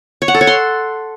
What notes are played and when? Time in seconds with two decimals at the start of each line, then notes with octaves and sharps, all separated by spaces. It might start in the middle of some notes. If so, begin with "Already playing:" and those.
0.22 C#5
0.28 F#5
0.34 A4
0.41 C#5
0.47 C6